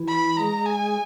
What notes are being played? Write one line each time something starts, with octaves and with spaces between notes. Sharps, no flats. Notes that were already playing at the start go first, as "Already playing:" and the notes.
Already playing: E3 E4
B5
G#3 G#4 A#5
G#5